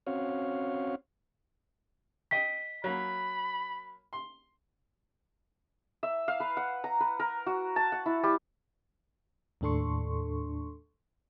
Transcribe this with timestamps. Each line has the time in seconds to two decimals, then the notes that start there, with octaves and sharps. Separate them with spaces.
0.07 C4 C#4 F#4 C#5 F5
2.31 D#5 G5 B6
2.84 F#3 A#3 B5
4.13 C6
6.03 E5
6.28 F5
6.40 B4
6.57 F#5
6.84 A#5
7.00 B4
7.19 A#4
7.46 F#4
7.76 A5
7.92 F#5
8.06 E4
8.23 G3
9.61 D#2 A2 D4 A4 C6 C#6